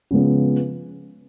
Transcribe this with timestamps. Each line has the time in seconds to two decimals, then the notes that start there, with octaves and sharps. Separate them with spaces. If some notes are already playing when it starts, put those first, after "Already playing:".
0.11 C#3 F3 G#3 B3